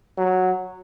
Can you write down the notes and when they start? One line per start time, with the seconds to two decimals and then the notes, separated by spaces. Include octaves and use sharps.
0.18 F#3